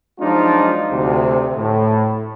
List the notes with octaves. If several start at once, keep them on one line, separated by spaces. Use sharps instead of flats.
F3 F#3 G#3 D4 D#4 F4
D2 C3
A2